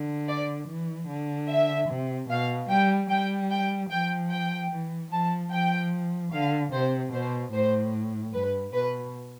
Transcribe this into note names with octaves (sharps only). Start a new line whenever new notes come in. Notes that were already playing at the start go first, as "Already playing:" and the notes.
Already playing: D3
D5
E3
D3
E5
C3
B2 F5
G3 G5
G3 G5
G5
F3 G5
G5
E3
F3 A5
F3 G5
D3 F5
C3 C5
B2 C5
A2 C5
G2 B4
B2 B4